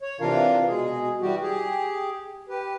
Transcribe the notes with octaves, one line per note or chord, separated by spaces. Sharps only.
C#5
C3 E3 D4 F4 A#4 F5
B2 G#3 G#4
E3 G3 F#4 G4
G4 G#4
G4 B4